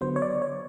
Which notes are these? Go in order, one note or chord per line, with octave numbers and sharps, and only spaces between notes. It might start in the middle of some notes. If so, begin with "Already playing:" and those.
D3 F#3 B3 C5
C#5
D5
C#5